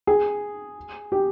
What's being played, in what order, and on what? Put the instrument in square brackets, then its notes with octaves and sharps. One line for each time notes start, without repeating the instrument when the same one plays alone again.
[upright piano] G#4
G4